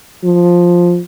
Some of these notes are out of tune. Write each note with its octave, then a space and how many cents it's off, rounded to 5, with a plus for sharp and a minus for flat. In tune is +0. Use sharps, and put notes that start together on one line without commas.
F3 +5